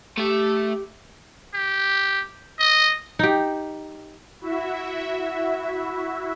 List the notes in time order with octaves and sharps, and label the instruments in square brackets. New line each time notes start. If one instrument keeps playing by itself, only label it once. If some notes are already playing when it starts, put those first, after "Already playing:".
[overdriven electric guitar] A3 E5 [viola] G4
[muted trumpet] G4
D#5
[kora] D#4 G4
[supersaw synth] E4 F#4 E5